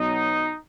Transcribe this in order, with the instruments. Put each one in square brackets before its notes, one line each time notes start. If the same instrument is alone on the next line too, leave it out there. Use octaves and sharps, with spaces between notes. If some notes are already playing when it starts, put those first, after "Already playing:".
Already playing: [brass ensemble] B2 F#3 D#4